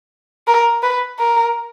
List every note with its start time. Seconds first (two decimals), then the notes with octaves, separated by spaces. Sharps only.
0.48 A#4
0.83 B4
1.19 A#4